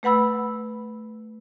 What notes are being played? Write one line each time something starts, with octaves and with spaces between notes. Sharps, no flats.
A3 B4 F#5 B5 E6